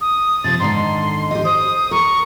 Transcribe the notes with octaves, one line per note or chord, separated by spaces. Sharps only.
D#6
C3 F3 C4 A6
G#2 D3 D#3 C6
G4 D#5
C5 D#6
A#4 C#6